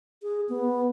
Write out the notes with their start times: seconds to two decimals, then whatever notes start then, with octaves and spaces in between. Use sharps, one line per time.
0.23 G#4
0.49 B3